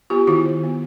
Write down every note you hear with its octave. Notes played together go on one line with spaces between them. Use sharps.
B3 F4 G4
D#3 E4 F#4
D#3
B3